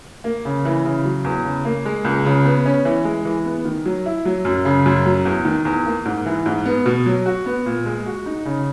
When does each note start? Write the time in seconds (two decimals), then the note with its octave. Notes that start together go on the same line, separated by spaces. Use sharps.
0.24 A#3
0.45 C#3
0.65 E3
0.85 C#3
1.05 F#3
1.24 E2
1.45 C#3
1.65 A#3
1.85 G#3
2.05 C#2
2.25 C#3
2.45 B3
2.66 C#4
2.85 E3
3.05 G#3
3.25 E3
3.45 B3
3.65 D#3
3.85 F#3
4.06 E4
4.25 F#3
4.45 F#2
4.65 C#3
4.86 F#2
5.06 F#3
5.25 E2
5.45 D#3
5.65 E2
5.86 A#3
6.05 G#2
6.26 E3
6.46 G#2
6.66 B3
6.86 B2
7.06 F#3
7.26 F#4
7.46 B3
7.66 A#2
7.86 G#3
8.06 F#4
8.26 D#4
8.45 C#3